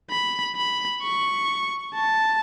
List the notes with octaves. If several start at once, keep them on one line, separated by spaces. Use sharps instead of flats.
B5
B5
C#6
A5